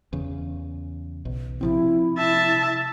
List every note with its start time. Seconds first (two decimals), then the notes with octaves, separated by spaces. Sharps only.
0.13 E2 C#3
1.25 B1
1.61 C3 F3 C4 E4
2.18 E5 A5